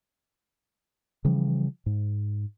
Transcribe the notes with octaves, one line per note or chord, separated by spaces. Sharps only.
C#3 E3 F3 G3
G#2